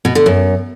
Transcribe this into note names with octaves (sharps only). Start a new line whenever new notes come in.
B2
D3
F#2